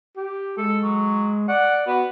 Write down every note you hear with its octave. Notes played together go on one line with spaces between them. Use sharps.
G4
G#3 A4
F#3
D5 F#5
B3 F#4